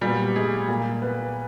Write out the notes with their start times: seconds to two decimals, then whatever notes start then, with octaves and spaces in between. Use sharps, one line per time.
0.01 A#2 F#3 G3 B3 G4
0.36 G#3 G#4
0.68 A#2 G3 A#3
1.02 B3 B4